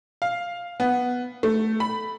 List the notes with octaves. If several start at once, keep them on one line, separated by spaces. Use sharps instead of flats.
F5
B3
A3
B5